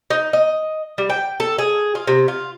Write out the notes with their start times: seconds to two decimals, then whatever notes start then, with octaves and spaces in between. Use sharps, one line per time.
0.10 D#4
0.33 D#5
0.98 G3
1.10 G5
1.40 A4
1.58 G#4
1.95 F4
2.07 C3
2.28 F4